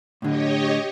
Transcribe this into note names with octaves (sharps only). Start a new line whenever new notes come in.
A2 D3 G4 C#5 D#5